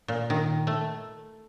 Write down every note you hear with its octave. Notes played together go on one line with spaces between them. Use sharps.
A#2
D#3
A3